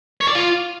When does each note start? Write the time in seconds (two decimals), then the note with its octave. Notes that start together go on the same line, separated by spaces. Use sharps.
0.21 C#5
0.28 D5
0.35 F4